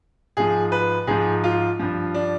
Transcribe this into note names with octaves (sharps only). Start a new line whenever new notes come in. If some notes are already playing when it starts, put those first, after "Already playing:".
G#2 F3 G#4
B4
G#2 F3 G#4
F4
G2 F3
D4